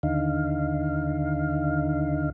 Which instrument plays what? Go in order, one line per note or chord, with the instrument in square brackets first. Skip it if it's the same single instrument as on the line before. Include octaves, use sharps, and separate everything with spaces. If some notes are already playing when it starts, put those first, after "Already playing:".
[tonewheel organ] D#2 D3 D#4 F5